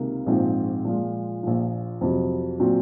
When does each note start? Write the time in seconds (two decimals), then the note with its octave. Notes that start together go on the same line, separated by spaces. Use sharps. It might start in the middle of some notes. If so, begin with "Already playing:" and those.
Already playing: C#2 C3 D#3 A#3
0.26 A#1 G#2 F3 C4
0.85 A#2 F3 G#3
1.43 A#1 A#2 F3
2.01 F2 C3 F#3
2.59 A#2 F#3 C4 F#4